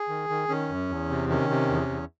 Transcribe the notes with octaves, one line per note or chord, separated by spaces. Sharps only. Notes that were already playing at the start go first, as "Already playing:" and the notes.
Already playing: G#4
D#3
D#3
D#3 C#4
F#2
E2
C3
D#3 C#4
C3
E2
E2